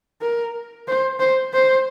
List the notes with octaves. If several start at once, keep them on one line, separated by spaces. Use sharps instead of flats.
A#4
C5
C5
C5